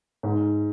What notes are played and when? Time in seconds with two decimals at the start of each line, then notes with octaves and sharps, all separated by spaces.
0.23 G#2